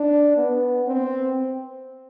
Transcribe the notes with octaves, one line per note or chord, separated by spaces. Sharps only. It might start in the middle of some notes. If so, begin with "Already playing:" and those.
Already playing: D4
B3
C4